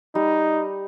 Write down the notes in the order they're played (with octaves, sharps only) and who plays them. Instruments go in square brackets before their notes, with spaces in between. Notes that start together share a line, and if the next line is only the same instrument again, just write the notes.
[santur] G3 [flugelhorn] D#4